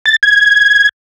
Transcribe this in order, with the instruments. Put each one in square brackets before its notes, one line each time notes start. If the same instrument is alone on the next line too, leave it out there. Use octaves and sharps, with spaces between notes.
[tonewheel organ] A6
G#6